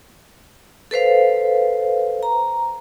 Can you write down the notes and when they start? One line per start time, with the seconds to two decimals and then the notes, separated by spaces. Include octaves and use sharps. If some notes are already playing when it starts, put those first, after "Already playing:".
0.91 A4 B4 C5 F5
2.23 A#5